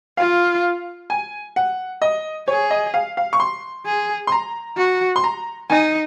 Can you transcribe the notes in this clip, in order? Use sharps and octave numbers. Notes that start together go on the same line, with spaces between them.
F4 F5
G#5
F#5
D#5
G#4 C#5
D#5
F5
F5
C#6
C6
G#4
C6
A#5
F#4
C6
A#5
D#4 G#5